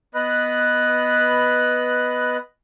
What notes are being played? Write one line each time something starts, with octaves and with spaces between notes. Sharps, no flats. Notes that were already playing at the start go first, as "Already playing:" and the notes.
B3 B4 D#5 B5 F#6